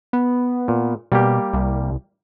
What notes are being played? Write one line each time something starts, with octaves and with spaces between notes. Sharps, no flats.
B3
A#2
B2 G3 A#3 G4
C2